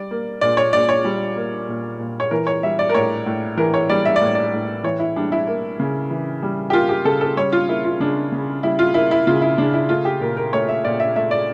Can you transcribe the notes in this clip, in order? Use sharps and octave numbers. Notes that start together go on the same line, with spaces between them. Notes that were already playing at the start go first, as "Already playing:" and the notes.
Already playing: G3 D5
A#3
A#2 D5
C#5
A#2 D5
C#5
G3
A#3
A#2
A#2
C#5
E3 A#4
C#5
G3 E5
D5
A#4
A2 C#5
A2
E3 A#4
C#5
G3 D5
E5
D5
A2 C#5
D5
A2
E3 C#5
E4
G3 D4
E4
A#3
C#3
E3
G3
G4
A#3 F4
G4
C#3 A4
A4
G3 C#5
F4
A#3 E4
F4
C#3 D4
C#3
G3 E4
F4
A#3 E4
E4
C#3 F4
E4
C#3 D4
E4
A3 F4
G4
A#2 A#4
A#4
A3 C#5
E5
A#2 D5
E5
A3 E5
D5